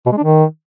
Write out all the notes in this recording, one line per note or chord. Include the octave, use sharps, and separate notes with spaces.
B2
G#3
D4
D#3